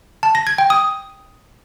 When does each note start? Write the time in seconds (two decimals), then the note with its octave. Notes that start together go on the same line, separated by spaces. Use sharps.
0.23 A5
0.35 A#6
0.47 G#6
0.58 G5
0.70 D#6